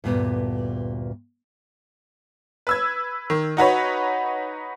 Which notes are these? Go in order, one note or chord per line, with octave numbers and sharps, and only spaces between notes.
D2 G2 A#2 B3
B4 E6 G#6
D#3
D#4 F#4 B4 C#5